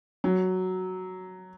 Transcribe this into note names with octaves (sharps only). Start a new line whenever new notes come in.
F#3